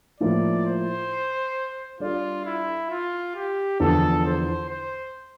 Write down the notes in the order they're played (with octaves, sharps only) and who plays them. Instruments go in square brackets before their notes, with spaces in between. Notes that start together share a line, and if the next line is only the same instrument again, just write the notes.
[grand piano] A2 F3 A#3 [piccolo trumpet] D5
[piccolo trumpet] C5
[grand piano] G3 D4 A4 D5 [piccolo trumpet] F4
[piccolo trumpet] E4
F4
G4
[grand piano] E2 D3 F3 [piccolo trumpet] A4
[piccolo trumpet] C5
C5